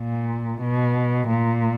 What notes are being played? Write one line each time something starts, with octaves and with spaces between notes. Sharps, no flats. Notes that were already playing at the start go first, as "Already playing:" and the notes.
Already playing: A#2
B2
A#2